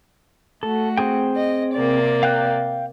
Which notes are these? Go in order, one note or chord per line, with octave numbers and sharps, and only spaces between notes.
A3 F#4 A4
C4 G#4 G5
D#5
C3 A#3 D5
F5 G5 F#6